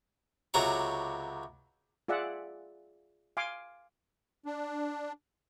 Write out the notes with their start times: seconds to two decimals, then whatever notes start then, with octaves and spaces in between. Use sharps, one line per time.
0.54 C#2 C3 F#3 A#5 C#6
2.08 F4 G#4 D5 E5 F#5
3.37 F5 G#5 C6 D6
4.46 D4